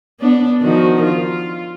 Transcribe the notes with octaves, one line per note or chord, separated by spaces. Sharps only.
B3 D4
D#3 F3 F#4
F4